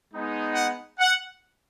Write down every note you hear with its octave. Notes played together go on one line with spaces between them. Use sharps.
G#3 B3 D#4
F#5
F#5